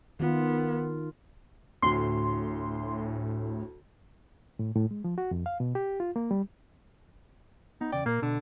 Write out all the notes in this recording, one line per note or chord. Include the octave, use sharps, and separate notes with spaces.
D#3 B3 F4
D2 A2 C6
A2
A2
G#3
F3
F#4
F2
F5
B2
G4
F4
A#3
G3
B3 D#4
E2 C#3 D5 G5
A#2 A#3 A#4
B2 D3